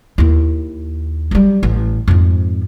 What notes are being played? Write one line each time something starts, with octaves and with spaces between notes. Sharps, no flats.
D#2 E4
F#3 G3
A1
F2 G#2